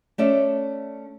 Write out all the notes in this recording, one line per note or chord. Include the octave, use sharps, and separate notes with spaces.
A3 C#4 D5 E5